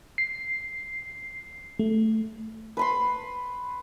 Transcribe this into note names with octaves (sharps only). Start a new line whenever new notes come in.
C7
A3
B4 B5 C6